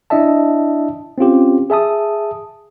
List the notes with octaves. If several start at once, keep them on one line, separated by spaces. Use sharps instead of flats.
D4 E4 D#5 E5 A5
C4 C#4 F4 G4
G#4 E5 A5 D#6